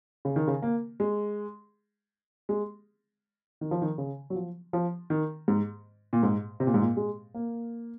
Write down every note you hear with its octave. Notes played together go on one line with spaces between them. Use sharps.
C#3
D#3
C#3
A#3
G#3
G#3
D#3
F3
D#3
C#3
F#3
F3
F3
D#3
G#2
A#2
G#2
C3
A#2
G#2
A#2
G#3
A#3